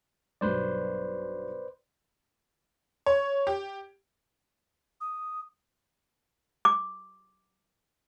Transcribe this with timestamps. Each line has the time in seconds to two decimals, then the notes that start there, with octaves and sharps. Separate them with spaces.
0.41 B1 G2 F#3 B4 C5 D5
3.06 C#5
3.47 G4
5.01 D#6
6.65 D6